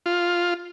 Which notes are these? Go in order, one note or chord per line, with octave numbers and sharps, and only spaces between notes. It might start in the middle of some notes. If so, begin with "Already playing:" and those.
F4